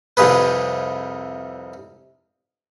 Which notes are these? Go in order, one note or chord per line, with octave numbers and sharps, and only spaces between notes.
C2 F2 C3 G#4 B4